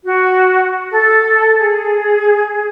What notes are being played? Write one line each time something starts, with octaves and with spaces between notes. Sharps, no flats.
F#4
A4
G#4